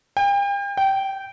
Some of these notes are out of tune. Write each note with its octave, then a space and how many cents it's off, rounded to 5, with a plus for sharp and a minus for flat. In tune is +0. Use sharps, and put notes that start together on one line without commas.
G5 +40
G5 -15